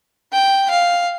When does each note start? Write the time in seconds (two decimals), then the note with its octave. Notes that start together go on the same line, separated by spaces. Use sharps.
0.33 G5
0.71 F5